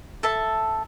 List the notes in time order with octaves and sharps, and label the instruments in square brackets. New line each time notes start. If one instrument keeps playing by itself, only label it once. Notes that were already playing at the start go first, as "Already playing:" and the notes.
[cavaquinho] A4 E5 A5